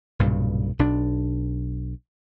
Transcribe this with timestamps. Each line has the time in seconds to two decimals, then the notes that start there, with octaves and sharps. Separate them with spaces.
0.19 B1 G2 A#2 C#3
0.79 B1 D4